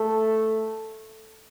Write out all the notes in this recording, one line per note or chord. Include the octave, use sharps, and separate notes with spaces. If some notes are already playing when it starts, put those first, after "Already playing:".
Already playing: A3 A4